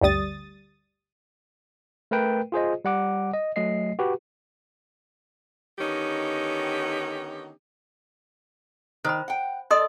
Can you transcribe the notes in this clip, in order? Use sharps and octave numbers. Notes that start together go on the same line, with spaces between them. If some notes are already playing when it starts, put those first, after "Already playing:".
G1 D2 G3 D#6 A6
A3 A#4 B4 G5
F4 G#4 C5 D#5
G3 F#5 D6
D#5
F#3 A3 D#5 C7
F#4 G4 B4
D3 D#3 B3 C#4 D#4 G4
D#3 C5 B5
F#5 G5
A4 D5 D#5 C6 D#6